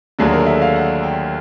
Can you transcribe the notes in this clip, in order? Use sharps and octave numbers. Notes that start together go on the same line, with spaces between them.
D#2 D3 F#3 A3 G#4
A#4
E5
F5
F#5
G5